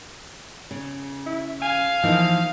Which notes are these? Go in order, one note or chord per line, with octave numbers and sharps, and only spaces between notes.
C#3
E4
F5 G#5
E3 F3 A#3 D#4